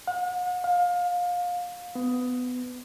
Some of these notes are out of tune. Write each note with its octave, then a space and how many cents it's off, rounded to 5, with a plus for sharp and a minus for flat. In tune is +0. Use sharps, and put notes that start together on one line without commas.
F#5 -45
F5 +25
B3 +20